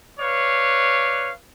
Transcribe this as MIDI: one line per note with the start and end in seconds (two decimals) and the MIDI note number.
0.19 1.31 71
0.19 1.31 73
0.19 1.31 74
0.19 1.31 77